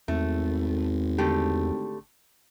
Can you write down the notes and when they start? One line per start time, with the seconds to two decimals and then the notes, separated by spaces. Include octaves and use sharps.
0.08 G#1 E2 A3
1.18 D3 A3 G4